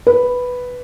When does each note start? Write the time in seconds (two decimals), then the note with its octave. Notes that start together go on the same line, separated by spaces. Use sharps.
0.07 B4